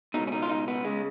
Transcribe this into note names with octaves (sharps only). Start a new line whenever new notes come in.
C#2 B2 D#4
C#4
D#4
F4
D#4
B3
C#3 G#3